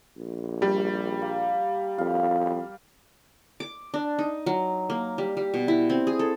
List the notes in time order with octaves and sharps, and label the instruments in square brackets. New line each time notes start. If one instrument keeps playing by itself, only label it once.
[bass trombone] A#1
[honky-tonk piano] G3
[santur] A#3
[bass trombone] F2 [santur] F5
[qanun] D6
D4
D#4
F#3
A#3
G3
G3
B2
E4
C4
G#4
A4